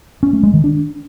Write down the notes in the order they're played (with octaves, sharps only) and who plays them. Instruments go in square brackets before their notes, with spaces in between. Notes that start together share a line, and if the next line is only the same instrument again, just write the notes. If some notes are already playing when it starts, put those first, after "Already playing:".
[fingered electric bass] C#4
A3
G#3
D#3
D4